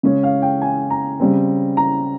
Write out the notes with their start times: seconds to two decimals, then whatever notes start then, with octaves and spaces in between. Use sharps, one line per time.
0.03 C#3 G#3 C#4
0.23 F5
0.42 G5
0.62 G#5
0.90 A#5
1.20 C#3 G3 C4
1.77 A#5